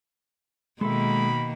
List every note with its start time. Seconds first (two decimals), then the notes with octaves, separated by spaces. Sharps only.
0.81 B2 D#3 G#3 A#3 A4 E5 B5